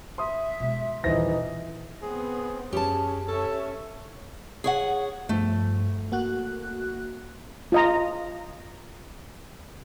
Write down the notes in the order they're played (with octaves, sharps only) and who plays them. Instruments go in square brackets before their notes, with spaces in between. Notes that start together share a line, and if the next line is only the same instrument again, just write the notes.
[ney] E5 [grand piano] C6 D#6
[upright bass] B2 G#3
[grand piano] D#1 C5 A#6 [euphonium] E3 [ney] D#4
[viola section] B3 C4 [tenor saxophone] G#4
[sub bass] F#2 [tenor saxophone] C#4 [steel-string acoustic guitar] G4 A5 [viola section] G#4
[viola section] C#4 C#5 E5 [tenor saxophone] A4
[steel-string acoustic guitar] G#4 C#5 F#5
[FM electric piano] G2 F3 [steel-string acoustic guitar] A3
[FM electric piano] A#3 F#4 F#6
[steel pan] F4 D#5 A#5